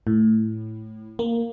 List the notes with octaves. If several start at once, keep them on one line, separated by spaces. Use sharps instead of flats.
A2
A#3